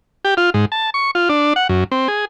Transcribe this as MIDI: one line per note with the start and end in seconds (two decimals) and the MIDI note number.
0.25 0.34 67
0.37 0.50 65
0.54 0.65 44
0.72 0.90 81
0.94 1.11 85
1.15 1.29 65
1.29 1.53 62
1.56 1.68 78
1.69 1.84 42
1.92 2.08 60
2.08 2.25 68